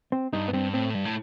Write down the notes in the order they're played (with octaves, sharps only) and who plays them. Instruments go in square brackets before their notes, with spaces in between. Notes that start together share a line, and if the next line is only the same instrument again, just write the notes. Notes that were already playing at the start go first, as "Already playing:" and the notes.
[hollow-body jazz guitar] C4
[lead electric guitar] G2 [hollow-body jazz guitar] D#4
[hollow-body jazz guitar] B3
[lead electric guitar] G2 [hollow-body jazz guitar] C4
[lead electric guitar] A2 [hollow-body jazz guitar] C4
[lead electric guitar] G2
A2